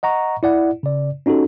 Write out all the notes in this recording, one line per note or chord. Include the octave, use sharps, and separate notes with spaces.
D#5 F#5 A#5 C#6
E4 D5 F#5
C#3 D5
C#4 D#4 F#4 G4 A4